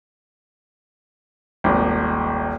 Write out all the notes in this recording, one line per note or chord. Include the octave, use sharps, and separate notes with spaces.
D#1 G#1